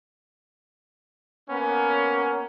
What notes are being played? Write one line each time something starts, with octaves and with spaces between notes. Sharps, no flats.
A#3 B3 C#4